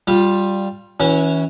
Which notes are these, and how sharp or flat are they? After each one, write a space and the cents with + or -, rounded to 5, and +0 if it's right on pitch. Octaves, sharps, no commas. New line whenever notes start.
G3 +0 F4 +15
E3 -25 C#4 +5 F#4 +0